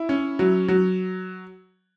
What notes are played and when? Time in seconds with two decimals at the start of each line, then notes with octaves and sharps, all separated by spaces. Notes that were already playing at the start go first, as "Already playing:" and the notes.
Already playing: E4
0.09 C#4
0.39 F#3
0.68 F#3